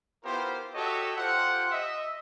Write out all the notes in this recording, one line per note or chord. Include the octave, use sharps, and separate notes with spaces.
B3 E4 F4 G4 A#4 C5
F#4 G4 A4 C#5 D#5 E5
F4 G4 A4 C5 F#5
D#5 E5